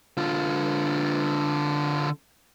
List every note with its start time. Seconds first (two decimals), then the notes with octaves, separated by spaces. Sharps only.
0.17 D3 F4